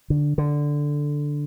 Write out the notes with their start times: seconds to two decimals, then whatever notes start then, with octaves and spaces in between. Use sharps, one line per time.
0.10 D3
0.38 D3